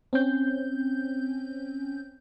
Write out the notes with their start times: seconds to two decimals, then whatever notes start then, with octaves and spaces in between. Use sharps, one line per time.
0.13 C4 C#4 G6